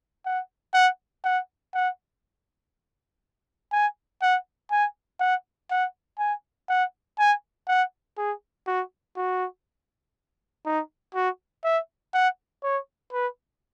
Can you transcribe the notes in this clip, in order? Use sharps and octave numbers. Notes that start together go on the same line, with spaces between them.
F#5
F#5
F#5
F#5
G#5
F#5
G#5
F#5
F#5
G#5
F#5
G#5
F#5
G#4
F#4
F#4
D#4
F#4
E5
F#5
C#5
B4